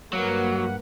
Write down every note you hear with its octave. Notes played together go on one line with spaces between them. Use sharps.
G2 F#3 A#3 B4 F#5